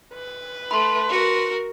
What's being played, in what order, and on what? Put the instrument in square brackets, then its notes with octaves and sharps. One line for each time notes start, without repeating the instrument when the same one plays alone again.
[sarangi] B4
[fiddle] A3 [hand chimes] B5 C6
[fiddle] F#4 A#4